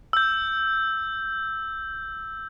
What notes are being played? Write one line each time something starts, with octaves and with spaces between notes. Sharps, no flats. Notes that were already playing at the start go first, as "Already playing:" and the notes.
E6 G6